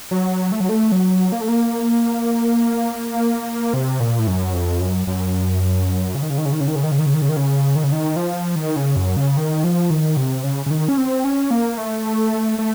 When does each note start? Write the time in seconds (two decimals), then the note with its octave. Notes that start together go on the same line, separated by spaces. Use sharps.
0.11 F#3
0.52 A3
0.60 F#3
0.69 A3
0.92 F#3
1.32 A#3
1.41 A3
1.48 A#3
3.74 C3
4.00 A#2
4.19 A2
4.27 F#2
4.54 F2
4.81 F#2
5.07 F#2
6.15 C#3
6.22 D#3
6.30 C#3
6.38 D#3
6.46 C#3
6.52 D#3
6.60 C#3
6.68 D#3
6.76 C#3
6.83 D#3
6.91 C#3
6.99 D#3
7.06 C#3
7.14 D#3
7.22 C#3
7.29 D#3
7.37 C#3
7.76 D#3
7.84 C#3
7.92 D#3
8.16 F3
8.56 D#3
8.76 C#3
8.96 F#2
9.17 C#3
9.37 D#3
9.64 F3
9.90 D#3
10.17 C3
10.44 C#3
10.66 C#3
10.71 D#3
10.89 C#4
10.98 C4
11.24 C#4
11.51 A#3
11.78 A3
12.58 A3